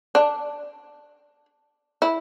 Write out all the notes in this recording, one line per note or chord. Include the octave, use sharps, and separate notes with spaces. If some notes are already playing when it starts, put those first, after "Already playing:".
D4
E4